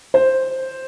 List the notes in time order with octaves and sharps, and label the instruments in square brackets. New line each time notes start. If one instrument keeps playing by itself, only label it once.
[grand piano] C5